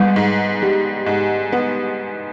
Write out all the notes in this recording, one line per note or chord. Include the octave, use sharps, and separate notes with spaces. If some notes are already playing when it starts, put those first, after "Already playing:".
Already playing: G#2 G3 B3
G#2
G3
G#2
B3